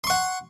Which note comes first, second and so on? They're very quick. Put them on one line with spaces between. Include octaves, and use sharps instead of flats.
C6 C#6 F#5